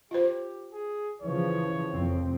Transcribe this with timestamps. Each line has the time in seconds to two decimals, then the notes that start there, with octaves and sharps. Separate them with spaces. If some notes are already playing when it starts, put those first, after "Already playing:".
0.11 F4 G4 C5
0.72 G#4
1.22 C#3 E3 F3 C#5
1.91 F1 F2 C4